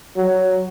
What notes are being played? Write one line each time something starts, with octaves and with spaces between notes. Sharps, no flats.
F#3